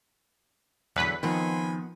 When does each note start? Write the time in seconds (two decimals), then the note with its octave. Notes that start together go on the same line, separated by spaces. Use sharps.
0.96 E2 D3 F#3 B4 B6
1.23 D#3 F3 B3 C4 D#4 G#5 B5 C6